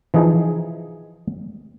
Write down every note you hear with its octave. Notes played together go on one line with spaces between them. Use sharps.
E3 F3 D#4 G#4